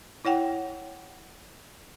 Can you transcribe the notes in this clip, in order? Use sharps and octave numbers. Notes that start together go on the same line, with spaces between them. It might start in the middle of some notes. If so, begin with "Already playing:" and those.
E4 C#5 F#5 G5